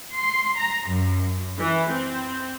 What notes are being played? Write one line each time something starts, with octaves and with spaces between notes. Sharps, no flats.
C6
A#5
F#2
E3
C4